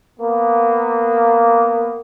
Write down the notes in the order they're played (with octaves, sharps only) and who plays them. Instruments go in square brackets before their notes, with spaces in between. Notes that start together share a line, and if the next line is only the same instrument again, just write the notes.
[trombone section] A#3 B3